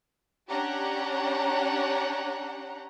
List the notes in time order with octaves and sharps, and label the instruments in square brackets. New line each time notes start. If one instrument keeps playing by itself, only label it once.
[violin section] C#4 D4 G4 F#5 A#5